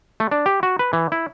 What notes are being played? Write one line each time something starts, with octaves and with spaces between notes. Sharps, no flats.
A3
D4
G4
F#4
B4
E3
E4